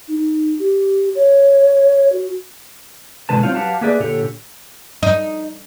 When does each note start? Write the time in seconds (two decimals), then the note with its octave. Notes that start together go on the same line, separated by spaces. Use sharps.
0.08 D#4
0.59 G4
1.15 C#5
2.12 F#4
3.29 B2 D3 G3 G#3 B4 A5
3.43 G3 C4 D#4 F4 C#5 F5
3.55 F#3 G4 B4 F5 F#5 A5
3.81 A#3 G4 G#4 B4 D5 E5
4.00 A#2 D3 G4 A4 C#5
5.03 D#4